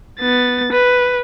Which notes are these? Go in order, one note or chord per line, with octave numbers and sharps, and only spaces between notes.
B3 A6
B4